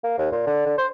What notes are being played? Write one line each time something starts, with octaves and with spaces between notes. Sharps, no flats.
A#3
D#2
A#2
D3
D3
C5